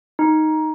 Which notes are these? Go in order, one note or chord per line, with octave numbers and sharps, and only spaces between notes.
D#4